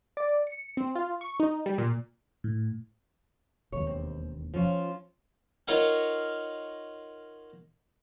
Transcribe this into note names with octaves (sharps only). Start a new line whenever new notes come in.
D5
C#7
C4
F4
C#6
D#4
G3
A#2
A2
E1 D#2 C#5
C4
F3 C#4 F4
D#4 F4 A#4 C#5 F5 F#5